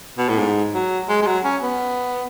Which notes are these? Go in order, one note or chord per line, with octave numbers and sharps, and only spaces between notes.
B2
A2
G#2
F#3
G#3
G#3
F#3
C#4
B3